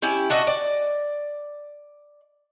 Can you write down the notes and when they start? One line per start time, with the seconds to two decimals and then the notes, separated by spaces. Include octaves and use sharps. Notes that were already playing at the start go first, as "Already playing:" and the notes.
0.02 C#4 E4 G4
0.30 D4 F#4 D#5 E5
0.47 D5